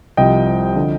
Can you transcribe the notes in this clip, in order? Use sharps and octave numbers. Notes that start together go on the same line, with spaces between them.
C2 C3 F3 D#5 G5
D3 F3